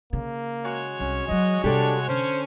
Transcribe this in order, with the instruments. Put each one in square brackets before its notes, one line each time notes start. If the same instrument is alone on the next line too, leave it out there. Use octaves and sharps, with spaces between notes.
[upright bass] C#3 [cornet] A#3
[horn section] G#3 F#4 C#5
[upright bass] C2 [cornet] C#4
[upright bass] E3 F#3 [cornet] D#5
[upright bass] C3 G3 [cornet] D4 [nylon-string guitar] G4 A4
[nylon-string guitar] D3 [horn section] C#4 [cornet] C5